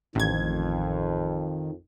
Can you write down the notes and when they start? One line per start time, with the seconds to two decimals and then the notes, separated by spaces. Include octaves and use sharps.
0.15 A1 F2 D#3 G#6